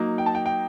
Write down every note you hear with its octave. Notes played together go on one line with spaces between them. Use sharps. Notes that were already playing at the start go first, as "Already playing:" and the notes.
Already playing: F#3 A#3 D#4
G5
A5
G5
G5